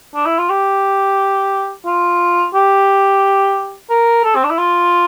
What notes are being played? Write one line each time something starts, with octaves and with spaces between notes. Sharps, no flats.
D4
E4
F4
G4
F4
G4
A#4
A4
C4
D4
E4
F4